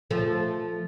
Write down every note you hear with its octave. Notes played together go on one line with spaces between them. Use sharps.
F3 A3